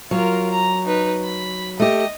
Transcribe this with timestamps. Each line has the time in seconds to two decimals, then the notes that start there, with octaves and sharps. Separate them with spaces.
0.11 F#3 F4 A#4
0.51 A#5
0.86 D#4 B4
1.24 B5
1.80 A3 G4 D#5